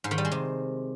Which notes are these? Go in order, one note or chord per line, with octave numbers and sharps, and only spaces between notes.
G#2
D#3
G3
G#3
C3